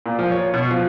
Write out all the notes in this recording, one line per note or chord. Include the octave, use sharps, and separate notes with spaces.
A#2
F3
C#5
B2
F3